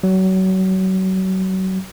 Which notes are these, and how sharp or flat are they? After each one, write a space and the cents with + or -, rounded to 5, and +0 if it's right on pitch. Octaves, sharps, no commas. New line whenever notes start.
F#3 +30